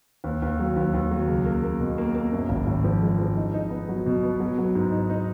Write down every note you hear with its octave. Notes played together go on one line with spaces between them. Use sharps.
D#2
D#2
F#3
D#2
D#2
F#3
C#2
A#3
A#3
B2
A#3
A#3
F#2
G#1
G#1
F3
G#3
F3
D#4
D#4
B3
F#3
B2
B3
F#3
F#3
G#2
D#4
D#4